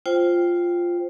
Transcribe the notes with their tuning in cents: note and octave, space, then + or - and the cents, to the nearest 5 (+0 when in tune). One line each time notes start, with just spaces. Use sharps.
F4 +0 C5 +0 G5 +0